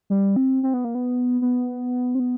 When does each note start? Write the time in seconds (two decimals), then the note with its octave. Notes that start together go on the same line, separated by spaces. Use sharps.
0.10 G3
0.36 C4
0.63 C4
0.74 B3
0.85 A#3
0.95 B3
1.42 B3
2.15 C4
2.20 B3